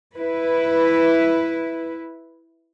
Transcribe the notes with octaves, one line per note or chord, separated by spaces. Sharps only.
E4 B4